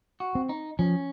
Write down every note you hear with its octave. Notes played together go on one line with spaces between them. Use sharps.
F#4
C4
D#4
F3 C#4